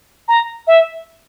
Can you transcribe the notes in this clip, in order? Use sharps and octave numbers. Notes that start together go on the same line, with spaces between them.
A#5
E5